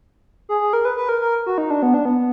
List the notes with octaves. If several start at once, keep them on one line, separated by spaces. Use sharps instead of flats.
G#4
G#4
A#4
B4
B4
A#4
A#4
F#4
D#4
D4
B3
D4
B3